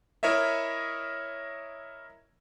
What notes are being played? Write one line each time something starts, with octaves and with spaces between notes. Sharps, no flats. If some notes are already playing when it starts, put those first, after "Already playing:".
E4 A#4 C#5 D#5 E5